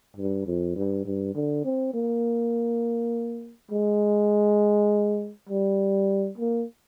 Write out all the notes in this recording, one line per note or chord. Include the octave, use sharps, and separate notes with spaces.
G2
F2
G2
G2
D3
C4
A#3
G#3
G3
A#3